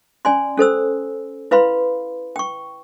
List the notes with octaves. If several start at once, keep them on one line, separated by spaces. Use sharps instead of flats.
C#4 D5 G#5 C6
C#4 A4 C5 E6
E4 B4 F5 B5 C6
G5 C#6